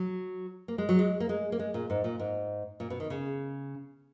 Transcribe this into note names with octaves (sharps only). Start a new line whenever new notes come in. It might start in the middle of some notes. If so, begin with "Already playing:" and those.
Already playing: F#3
A#3
G#3
F#3
G#3
A#3
G#3
A#3
G#3
A#2
G#2
A#2
G#2
A#2
B2
D#3
C#3